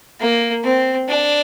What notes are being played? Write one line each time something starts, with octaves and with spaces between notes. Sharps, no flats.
A#3
C4
D4